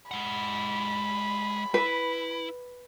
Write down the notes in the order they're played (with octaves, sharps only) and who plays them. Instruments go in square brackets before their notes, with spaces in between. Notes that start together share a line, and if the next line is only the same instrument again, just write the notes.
[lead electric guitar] G#3 F#5 [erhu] B5
[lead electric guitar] E4 [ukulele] B4